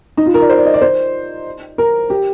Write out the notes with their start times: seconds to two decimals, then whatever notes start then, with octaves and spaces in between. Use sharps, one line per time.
0.17 D#4
0.26 F4
0.34 A#4
0.42 D5
0.50 C5
0.58 D5
0.66 D#5
0.74 D5
0.82 C5
1.78 A#4
2.10 G4